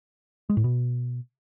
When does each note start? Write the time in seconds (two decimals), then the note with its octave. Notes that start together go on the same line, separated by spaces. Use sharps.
0.50 G#3
0.57 A2
0.64 B2